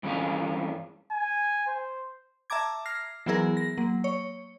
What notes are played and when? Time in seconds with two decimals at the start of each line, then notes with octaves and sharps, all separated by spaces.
0.03 G2 E3 F3 C#4 G#4 F5
1.12 G#5
1.67 C5
2.50 E5 A5 A#5 D6 G#6
2.86 F6 A#6 C7
3.26 E3 F#3 B3 E4 G#4 A#4
3.57 A#6
3.77 F#3 A#3
4.04 C#5